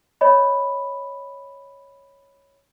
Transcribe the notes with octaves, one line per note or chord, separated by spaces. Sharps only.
C#5 D#5 B5